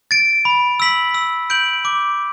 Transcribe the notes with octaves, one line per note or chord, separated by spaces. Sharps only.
A6 D7
B5
E6 B6 F#7
E6
G6 D7 F#7
D6